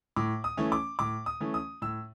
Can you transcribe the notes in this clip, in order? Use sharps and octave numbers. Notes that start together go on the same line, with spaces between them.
A2 D6
D#6
E3 A3 C#4
D6
A2 D6
D#6
E3 A3 C#4
D#6
A2 E6